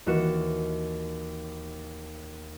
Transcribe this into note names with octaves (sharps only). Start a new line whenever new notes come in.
D#2 E3 F#4 C#7 E7